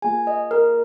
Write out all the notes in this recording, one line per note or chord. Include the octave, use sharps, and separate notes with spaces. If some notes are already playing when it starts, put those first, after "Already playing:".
A#3 F4 G#4 G#5
D#5
A#4